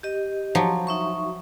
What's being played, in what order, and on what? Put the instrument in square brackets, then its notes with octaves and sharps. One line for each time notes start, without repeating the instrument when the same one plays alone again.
[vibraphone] G4 D#5
[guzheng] F3 F#3
[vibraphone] D#4 E5 C#6